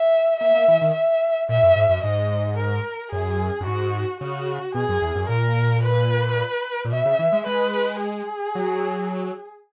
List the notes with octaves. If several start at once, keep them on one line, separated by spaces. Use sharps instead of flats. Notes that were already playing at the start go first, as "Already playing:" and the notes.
Already playing: E5
A#3 E5
A#3
E3
D#3
E5
A#2 E5
F#2
G#2
F#2
G#2 D#5
A#4
F#2 G#4
F#2
G#2 F#4
C#3 F#4
B2 G#4
F#2
E2
F#2
A#2 A#4
B4
A#2
B2 E5
C#3
E3
G#3
G#3 B4
G#4
F#3